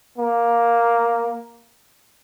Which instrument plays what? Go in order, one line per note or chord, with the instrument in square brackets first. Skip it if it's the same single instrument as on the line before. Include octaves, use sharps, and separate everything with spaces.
[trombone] A#3